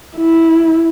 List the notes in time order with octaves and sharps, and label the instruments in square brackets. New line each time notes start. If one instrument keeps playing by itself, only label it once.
[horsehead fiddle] E4